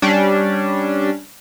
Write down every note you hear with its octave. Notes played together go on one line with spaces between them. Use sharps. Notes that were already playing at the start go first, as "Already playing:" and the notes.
G3 C#4 D4